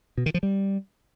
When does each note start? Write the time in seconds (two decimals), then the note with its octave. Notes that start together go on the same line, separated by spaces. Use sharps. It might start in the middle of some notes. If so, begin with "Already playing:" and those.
0.18 B2
0.26 D#3
0.34 F3
0.43 G3